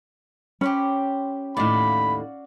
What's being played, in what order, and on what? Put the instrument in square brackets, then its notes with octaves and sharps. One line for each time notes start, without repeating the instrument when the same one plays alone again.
[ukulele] C#4 [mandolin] G4 C5 B5
[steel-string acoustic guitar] D#2 A2 [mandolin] F#4 D5 F5 [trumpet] B5